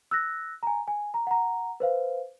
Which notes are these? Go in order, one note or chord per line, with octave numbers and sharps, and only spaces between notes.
E6 F#6 A#6
G#5 A#5
G#5
A#5
F#5 A#5
B4 C5 F5